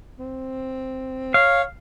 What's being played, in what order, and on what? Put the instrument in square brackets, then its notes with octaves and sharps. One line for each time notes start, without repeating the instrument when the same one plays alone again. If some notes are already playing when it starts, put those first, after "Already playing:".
[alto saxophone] C4
[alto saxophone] C#5 [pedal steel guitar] F5